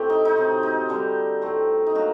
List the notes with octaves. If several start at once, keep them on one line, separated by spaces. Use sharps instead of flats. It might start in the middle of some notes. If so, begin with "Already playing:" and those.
Already playing: A2 A3 C4 G4
D#4
D#4
C3 F#3 C4
D#4
D3 G3 D4
A2 A3 C4
D#4
F#3 A#3 D4 F#4